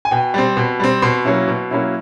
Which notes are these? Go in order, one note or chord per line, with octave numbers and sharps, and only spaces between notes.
G#5
B2 G5
G3 C4
B2
G3 C4
B2 C6
F#3 A#3 C#4 E4
B2
F#3 A#3 C#4 E4